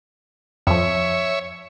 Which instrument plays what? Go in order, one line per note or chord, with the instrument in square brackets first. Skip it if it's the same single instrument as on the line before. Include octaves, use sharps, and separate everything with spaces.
[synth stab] F2 F3 [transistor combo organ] C#5 E5